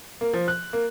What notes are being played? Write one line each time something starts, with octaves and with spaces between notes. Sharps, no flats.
A#3
F3
F#6
A#3